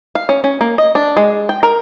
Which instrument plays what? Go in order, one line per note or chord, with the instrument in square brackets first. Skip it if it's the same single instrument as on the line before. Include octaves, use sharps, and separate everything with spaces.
[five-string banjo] F5
C#4
C#4
A#3
D#5
D4
G#3
G5
A#4